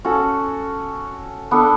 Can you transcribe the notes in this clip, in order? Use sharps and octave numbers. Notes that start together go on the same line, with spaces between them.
C#4 F#4 A4
B3 D4 A4